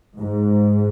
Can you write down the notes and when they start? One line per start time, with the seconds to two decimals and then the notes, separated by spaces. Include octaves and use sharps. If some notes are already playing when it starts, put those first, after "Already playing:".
0.16 G#2